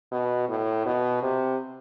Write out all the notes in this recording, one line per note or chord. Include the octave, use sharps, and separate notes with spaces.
B2
A2
B2
C3